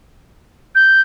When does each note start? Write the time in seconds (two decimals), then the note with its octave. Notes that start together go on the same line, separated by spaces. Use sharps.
0.75 G6